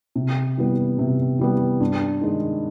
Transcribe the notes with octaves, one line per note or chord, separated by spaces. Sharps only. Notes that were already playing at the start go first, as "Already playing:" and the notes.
C3
E3 G3 B3
C3
E3 G3 B3
G2
D#3 G#3